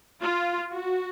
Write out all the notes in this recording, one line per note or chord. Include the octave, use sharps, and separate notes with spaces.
F4
F#4